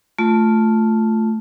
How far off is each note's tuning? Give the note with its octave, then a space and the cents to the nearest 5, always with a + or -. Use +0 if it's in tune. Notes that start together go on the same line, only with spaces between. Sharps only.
A3 +0 F4 +0